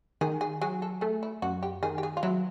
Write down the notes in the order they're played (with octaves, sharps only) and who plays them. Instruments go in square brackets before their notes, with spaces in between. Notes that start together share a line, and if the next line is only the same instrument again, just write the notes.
[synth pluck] D#3 [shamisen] G#4
[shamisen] G#4
[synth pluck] F#3 [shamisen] G#4
[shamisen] A4
[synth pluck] A3 [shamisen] G#4
[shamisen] E4
[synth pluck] F#2 [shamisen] F#4
[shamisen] G4
[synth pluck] D#3 [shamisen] G#4
[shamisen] G4
G#4
F4
[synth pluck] F#3 [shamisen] E4